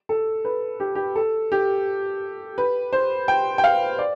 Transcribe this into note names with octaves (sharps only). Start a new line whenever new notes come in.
A4
B4
G4
G4
A4
G4
B4
C5
G5
G5
F5
D5